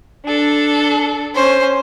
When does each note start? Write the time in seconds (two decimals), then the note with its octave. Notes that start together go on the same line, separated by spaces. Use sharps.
0.24 D4 A4
1.35 C#4 C5